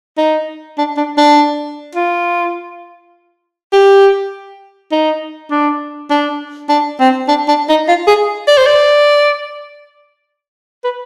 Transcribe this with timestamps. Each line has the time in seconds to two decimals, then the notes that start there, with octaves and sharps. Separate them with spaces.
0.18 D#4
0.78 D4
0.97 D4
1.17 D4
1.95 F4
3.73 G4
4.92 D#4
5.51 D4
6.10 D4
6.69 D4
7.00 C4
7.28 D4
7.48 D4
7.69 D#4
7.88 F4
8.07 G#4
8.48 D5
8.58 C5
8.66 D5
10.84 B4